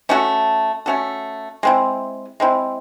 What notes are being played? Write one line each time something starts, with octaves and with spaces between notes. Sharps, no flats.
A3 C#4 F#4 A4
A3 C#4 F#4 A4
G#3 C4 E4
G#3 C4 E4